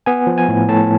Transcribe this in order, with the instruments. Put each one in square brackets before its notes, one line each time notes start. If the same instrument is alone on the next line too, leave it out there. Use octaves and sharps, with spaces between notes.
[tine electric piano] B3 G#5
F3
G#5
A2
A2 A5